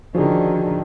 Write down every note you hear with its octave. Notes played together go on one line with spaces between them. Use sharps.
D3 D#3 F3 C#4 F#4 G#4